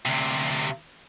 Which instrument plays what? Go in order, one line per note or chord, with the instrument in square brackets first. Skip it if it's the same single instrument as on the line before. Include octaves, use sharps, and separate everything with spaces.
[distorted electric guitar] D2 C3